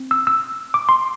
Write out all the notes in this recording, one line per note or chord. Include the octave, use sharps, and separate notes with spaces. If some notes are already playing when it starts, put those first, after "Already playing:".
Already playing: C4
E6
E6
D6
C6